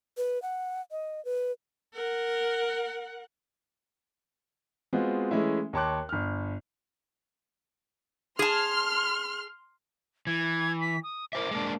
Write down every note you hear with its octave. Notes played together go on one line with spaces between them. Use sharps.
B4
F#5
D#5
B4
A#4 F#5
G#3 B3 C4 F4 F#4 G#4
E3 G#3 A3 C#4 E4
D#2 C#5 A5 C6 D6 F#6
G1 F6
G#4 A5 C6 F6
E3 G#6
B6
D#6
A#4 C5 E5 D6
G#3 A#3 D4